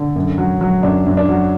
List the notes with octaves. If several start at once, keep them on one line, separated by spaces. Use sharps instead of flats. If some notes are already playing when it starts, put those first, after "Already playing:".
Already playing: D3
F#2
F#3
F#3
F#2 D4
F#2
D4
F#3